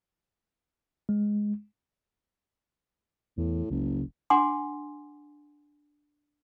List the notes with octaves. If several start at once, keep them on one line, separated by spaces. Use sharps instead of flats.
G#3
E2 A2
F#1 C#2
D4 F#5 G#5 C6 D6